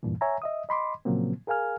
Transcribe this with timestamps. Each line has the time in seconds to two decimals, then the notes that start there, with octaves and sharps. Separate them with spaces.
0.03 E2 G2 A#2 E3
0.21 C#5 E5 G#5 A#5
0.42 D#5 E5 D#6
0.69 D#5 B5 C6 D6
1.05 A#2 C#3 F3 F#3 A#3 C4
1.47 G#4 A#4 F5 G#5 F6